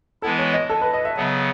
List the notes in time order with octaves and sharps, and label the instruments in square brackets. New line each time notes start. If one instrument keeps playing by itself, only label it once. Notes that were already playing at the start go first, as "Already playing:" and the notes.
[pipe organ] E3 G#3 B3 E4 [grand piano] A4
[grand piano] C#5
D#5
A4
B4
D#5
E5
[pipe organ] C#3 F#3 B3